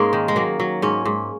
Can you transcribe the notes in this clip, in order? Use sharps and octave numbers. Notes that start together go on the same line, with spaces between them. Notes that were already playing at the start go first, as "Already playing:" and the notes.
Already playing: G#2 G#3 A#3 C#4 D#4
D#3
G#3
F#3 A#3
F#3
G#2 C#4
G#2